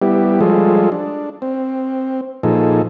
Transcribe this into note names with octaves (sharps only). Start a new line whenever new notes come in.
G3 B3 E4 G4
F3 G3 G#3 F4 G#4 A4
D4
C4
A#2 F3 D#4 G#4 A4